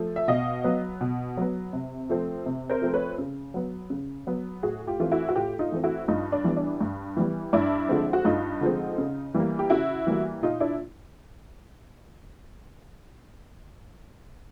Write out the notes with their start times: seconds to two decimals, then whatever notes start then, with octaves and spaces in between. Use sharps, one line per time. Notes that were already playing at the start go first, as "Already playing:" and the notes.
Already playing: F3 A3
0.16 E5
0.28 B2 D#5 F5
0.64 F#3 B3
1.01 B2
1.37 F#3 B3
1.73 C3
2.10 F3 A3 C4
2.46 C3
2.70 A#4 C5
2.82 F3 A3 C4
2.94 B4 C#5
3.18 C#3
3.54 F#3 B3
3.90 C#3
4.27 F#3 B3
4.63 A2 F#4 G#4
4.87 F4 G4
5.00 E3 A3 C4 F4
5.11 E4 F#4
5.29 F#4
5.35 A2 F4 G4
5.59 D#4 F4
5.72 E3 A3 C4
5.84 E4 F#4
6.08 G2 D#4 F4
6.32 D4
6.44 E3 G3 B3
6.57 D4
6.81 G2
7.17 E3 G3 B3
7.53 G2 D4 E4
7.89 D3 F3 G#3 C4
8.13 F#4
8.25 G2 D#4 F4
8.61 D3 F3 G#3 C4
8.98 C#3
9.34 E3 G3 A#3
9.59 G4
9.70 C#3 E4 F#4
10.07 E3 G3 A#3
10.42 A#2 D#4 F4
10.60 D4 E4